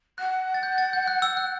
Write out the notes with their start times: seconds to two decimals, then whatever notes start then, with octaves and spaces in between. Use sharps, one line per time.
0.18 F#5 F#6
0.54 A6
0.63 G6
0.78 A6
0.93 G6
1.07 F#6
1.22 E6
1.37 F#6